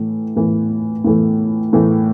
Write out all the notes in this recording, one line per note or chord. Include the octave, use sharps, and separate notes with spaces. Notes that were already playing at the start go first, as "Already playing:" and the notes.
Already playing: A2 E3 A3
A2 E3 A3
A2 E3 A3
A2 E3 A3